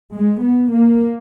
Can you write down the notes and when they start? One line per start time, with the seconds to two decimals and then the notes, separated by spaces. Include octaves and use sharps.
0.14 G#3
0.43 B3
0.72 A#3